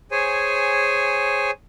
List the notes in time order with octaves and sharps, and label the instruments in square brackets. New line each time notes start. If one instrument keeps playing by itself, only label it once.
[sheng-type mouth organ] G#4 C5 C#5 G#5